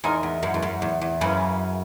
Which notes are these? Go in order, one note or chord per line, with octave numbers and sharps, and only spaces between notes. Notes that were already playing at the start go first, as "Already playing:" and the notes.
E2 G#3 D#4 A#4
E2
F#2
E2
F#2
E2
E2
F#2 C#3 E3 A#3 C#4